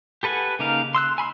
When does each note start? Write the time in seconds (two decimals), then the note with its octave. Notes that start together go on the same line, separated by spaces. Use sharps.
0.23 G4 A4 B4 F#5 G#5
0.59 C#3 A#3 D#4 A#4 F5
0.95 C6 E6 F#6
1.18 G#5 B5 C6 E6